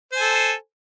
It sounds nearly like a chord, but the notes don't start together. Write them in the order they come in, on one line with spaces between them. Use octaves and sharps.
C5 G#5 A4